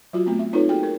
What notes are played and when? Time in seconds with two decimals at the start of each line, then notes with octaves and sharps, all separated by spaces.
0.13 F#3 F4 F#4
0.26 A3 B3 C4
0.39 E5
0.53 C4 D#4 F4 A4 B4 C#5
0.69 A#3 F#4 G#4 G5
0.83 G#4 A#4